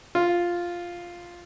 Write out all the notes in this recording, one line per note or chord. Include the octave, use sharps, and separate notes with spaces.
F4